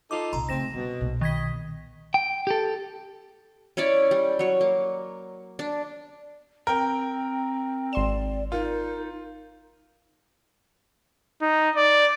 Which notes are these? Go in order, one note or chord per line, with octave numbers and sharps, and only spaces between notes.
D#4 F4 A4 D6
C2 A#2 A#5 C6
C#3 A3 C4 A#6 E7
G2 B2 G3
B1 A#2
D#3 D#5 G#6 B6
G5
G4 A4
C#4 E4 C#5 D5
G3
F#3 C#5
A#3
D4
C4 A#4 G5
G#1 D5 C6 E7
D#4 F4 A#4
D#4
D5